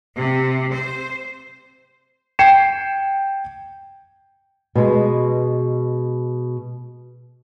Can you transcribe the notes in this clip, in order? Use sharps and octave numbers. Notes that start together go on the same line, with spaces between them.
C3
C5
G5 G#6 C7 C#7 E7
B2 G#3